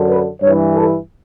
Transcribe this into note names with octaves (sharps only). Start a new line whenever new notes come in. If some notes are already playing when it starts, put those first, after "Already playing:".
Already playing: F#2 D3
B4
G2 E3 C#5
A4